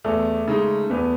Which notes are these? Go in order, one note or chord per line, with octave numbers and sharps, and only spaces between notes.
E2 A3
C#3 G#3 D#4
E2 B3